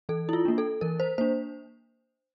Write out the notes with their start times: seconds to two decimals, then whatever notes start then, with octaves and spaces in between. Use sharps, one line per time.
0.09 E3 A4
0.29 E4
0.33 F4
0.45 A#3 D4
0.58 A4
0.81 E3 A#4
1.00 C5
1.18 A#3 D4 C5